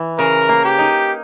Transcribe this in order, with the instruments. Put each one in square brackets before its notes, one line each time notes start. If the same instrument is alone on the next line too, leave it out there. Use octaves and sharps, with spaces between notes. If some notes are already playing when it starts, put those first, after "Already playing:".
Already playing: [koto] E3
[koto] C#3 [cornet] A#4
[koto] A#3
[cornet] G4
[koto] D#4